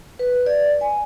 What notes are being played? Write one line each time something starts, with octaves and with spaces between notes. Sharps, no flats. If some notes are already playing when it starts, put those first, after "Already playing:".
B4
D5
G#5